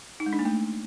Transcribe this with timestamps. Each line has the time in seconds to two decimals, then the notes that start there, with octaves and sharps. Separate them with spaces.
0.20 D#4
0.26 G#3
0.33 D4
0.39 A#3
0.45 A3